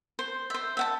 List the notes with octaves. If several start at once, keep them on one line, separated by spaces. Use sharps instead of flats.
C5
C5 E5
E5 F#5 A5